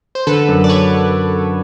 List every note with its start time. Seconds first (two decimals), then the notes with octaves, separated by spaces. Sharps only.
0.15 C5
0.27 D3 A4 B4
0.48 F#2
0.64 D5
0.69 B4 C#5